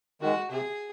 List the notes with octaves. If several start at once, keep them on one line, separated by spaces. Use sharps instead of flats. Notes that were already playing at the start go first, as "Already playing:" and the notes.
D#3 G#3 F#4
C3 G#4